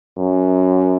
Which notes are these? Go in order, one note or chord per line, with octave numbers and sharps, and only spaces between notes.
F#2